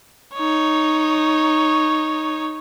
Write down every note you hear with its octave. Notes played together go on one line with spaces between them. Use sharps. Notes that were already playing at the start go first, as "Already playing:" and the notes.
D#4 C#5